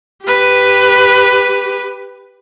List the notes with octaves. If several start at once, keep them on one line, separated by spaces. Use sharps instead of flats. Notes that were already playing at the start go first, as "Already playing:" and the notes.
G4 B4